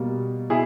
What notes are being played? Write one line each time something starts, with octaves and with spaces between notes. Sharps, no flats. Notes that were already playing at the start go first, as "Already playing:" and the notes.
Already playing: B2 G3 A#3
B2 E4 G#4